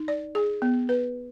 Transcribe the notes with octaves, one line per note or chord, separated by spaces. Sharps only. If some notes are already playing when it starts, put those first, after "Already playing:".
Already playing: D#4
D5
G#4
B3
B4